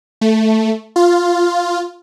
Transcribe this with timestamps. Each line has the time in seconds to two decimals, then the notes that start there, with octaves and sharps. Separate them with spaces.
0.21 A3
0.96 F4